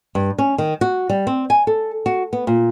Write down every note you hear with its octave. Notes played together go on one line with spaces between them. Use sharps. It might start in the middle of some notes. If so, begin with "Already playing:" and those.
G2
C#4
D#3
F#4
G3
C4
G#5
A4
F#4
B3
A#2